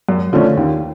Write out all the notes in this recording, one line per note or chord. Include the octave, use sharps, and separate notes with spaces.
F#2
D3 F3 A3 C#4
D#2